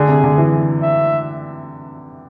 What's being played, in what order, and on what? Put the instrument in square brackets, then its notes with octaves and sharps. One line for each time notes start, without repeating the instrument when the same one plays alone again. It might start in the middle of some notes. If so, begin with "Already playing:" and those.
Already playing: [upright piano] D3 [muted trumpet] G#4
[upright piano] C3
D3
E3
[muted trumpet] E5